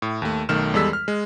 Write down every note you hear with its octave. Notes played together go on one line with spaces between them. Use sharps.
A2
D#2 A3
B1 D#3 A3 F6 E7
E2 G3 G#3 A4 E6 B6
F6
G#3